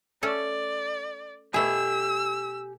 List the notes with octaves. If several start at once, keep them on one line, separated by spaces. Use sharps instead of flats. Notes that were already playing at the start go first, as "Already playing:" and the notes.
A3 C#4 A4 D5
B2 A3 E4 G4 G#5 E6